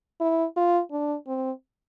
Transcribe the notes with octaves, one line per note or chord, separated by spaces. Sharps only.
E4
F4
D4
C4